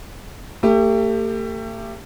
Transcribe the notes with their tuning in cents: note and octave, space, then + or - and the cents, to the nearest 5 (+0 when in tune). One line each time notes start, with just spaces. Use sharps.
A3 +40 G4 +15